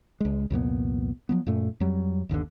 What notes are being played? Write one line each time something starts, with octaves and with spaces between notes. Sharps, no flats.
C#2 G#3
C2 F2 A#2 B3
F3 F#3 B3
F#2 A#2 A3
F2 F#3 G3
G1 D#2 A#2 D3